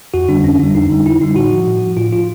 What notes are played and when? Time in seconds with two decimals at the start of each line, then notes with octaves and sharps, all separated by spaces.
0.14 F2 F#4
0.29 D3 G3 D4
0.44 F2 C#4
0.59 D3 G3 D4
0.74 F2 D#4
0.90 D3 G3
1.06 F2 E4
1.21 D3 G3 D#4
1.35 A2 F#4
1.52 F3
1.67 A2
1.82 F3
1.97 A2 F4
2.12 F3 F4